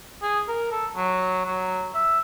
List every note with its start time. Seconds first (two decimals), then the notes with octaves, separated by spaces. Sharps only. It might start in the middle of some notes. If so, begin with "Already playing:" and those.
0.22 G#4
0.48 A#4
0.71 A4
0.96 F#3
1.45 F#3
1.94 E5